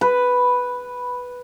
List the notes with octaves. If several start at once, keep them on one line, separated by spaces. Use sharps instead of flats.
B4